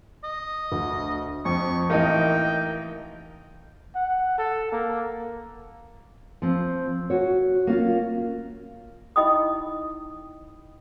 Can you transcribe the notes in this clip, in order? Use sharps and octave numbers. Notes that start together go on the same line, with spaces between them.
D#5
D2
F2 C#6
A1 A#3 D#4 A#4 D#5 G5
F#5
A4
A#3
F3 C4
F#4 C#5
A#3 C#4 F4
D#4 E4 D#5 G5 B5 D#6